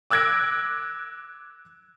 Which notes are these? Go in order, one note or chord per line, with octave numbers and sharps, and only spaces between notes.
D6 E6 F#6 G#6 A#6 D7